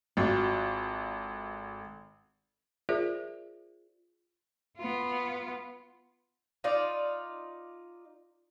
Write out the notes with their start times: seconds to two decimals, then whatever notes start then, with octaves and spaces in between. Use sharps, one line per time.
0.17 G#1 F4 F#4 A4
2.89 F4 G#4 A#4 C5 D5 E5
4.78 B3 F4
6.64 D#4 F4 D5